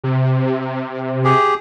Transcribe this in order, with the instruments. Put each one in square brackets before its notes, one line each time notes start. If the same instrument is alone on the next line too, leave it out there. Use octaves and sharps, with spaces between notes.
[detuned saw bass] C3
[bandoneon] G4 G#4